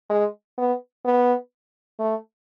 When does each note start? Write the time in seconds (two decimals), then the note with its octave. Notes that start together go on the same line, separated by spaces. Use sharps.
0.10 G#3
0.58 B3
1.05 B3
1.99 A3